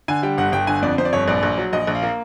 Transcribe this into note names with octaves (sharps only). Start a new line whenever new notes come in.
D3 G#5
G3 G5
G1 F#5
G1 G5
D3 G#5
F2 D5
F2 C5
D5
G1 C#5
A#1 D5
A#1
F#3
A#1 D#5
A#1
F5
A#3